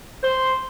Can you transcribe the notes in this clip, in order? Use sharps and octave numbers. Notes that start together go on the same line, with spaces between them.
C5